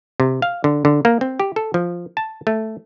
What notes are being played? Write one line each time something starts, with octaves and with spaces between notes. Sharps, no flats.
C3
F5
D3
D3
A#3
C4
G4
A4
F3
A5
A3